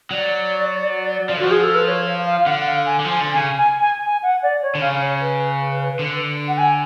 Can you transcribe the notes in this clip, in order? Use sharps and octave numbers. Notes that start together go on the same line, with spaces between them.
F#3 D5
F3
D3
F3 F#4
G#4
A4
B4
C#5
F5
F5
F5
D3 F#5
F5
G#5
D3
F3 G#5
D3
C#3 G#5
G#5
G#5
G#5
F#5
D5
C#5
D3
C#3 F5
C#5
B4
D3
F#5
G#5